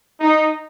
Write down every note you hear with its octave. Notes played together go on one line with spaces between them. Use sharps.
D#4